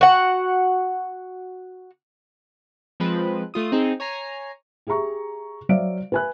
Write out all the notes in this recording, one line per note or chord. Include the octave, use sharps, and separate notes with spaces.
F#4 F#5
F3 G#3 C4 B4
A3 F4 D#6
C4 D#4 G#4
C#5 G#5 A#5 C7
G4 G#4 E5 A#5 C#6
F#3 C5 D5 E5 F5 D7
B4 E5 G#5 B5 F#6